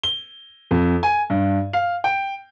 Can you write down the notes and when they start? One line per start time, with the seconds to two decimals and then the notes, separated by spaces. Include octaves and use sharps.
0.03 G7
0.71 F2
1.03 G#5
1.30 G2
1.73 F5
2.04 G5